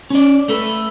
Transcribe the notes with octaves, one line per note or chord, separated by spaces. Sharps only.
C#4 D5
A3 A4 B4